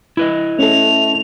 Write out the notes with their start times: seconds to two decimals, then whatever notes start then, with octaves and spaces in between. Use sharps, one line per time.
0.17 E4 B4 D#5
0.59 A3 C#4 A4 F7